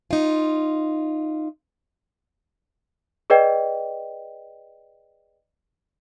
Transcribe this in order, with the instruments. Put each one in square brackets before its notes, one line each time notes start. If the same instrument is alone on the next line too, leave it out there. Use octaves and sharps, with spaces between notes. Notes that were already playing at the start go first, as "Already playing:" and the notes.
[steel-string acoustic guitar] D#4 F4
[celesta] G#4 B4 D5 D#5 G5